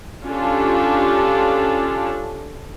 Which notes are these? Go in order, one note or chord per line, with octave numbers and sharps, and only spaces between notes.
C#4 D4 F4 G4 A4